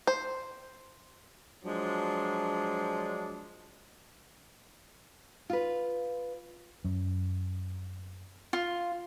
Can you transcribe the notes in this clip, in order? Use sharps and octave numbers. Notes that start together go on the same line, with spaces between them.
C5
F3 F#3 G#3 D4
F4 B4
F#2
F4